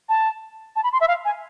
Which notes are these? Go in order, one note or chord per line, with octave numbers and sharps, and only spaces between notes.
A5
A5
B5
C6
E5
F5
G#5